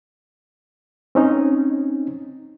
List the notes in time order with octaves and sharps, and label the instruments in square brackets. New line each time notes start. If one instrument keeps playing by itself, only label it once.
[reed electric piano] C4 C#4 D#4